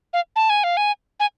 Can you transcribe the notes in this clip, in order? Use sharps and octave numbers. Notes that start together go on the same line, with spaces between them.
F5
A5
G#5
F5
G#5
G#5